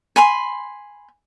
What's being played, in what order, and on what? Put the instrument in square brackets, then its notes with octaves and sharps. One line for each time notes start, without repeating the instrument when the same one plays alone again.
[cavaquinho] G#5 B5 C6